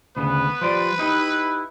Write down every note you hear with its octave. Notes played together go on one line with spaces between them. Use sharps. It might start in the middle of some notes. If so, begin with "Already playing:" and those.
D2 C#3 B3 B4
F3 G3 C5 D5
D#4 E4 G4 D#5